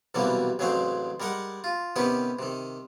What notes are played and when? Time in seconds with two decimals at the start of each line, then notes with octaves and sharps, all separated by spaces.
0.14 B1 C3 E3 F#3 G3 A#3
0.59 A1 C#3 F#3 G#3 C4 C5
1.20 G3 G#3 A#4 F#5
1.64 F4
1.96 C3 D#3 B3 C#4 G4 B4
2.39 C3 D#3